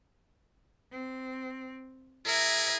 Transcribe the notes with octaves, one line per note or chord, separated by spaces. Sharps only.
C4
E4 G#4 A#4 E5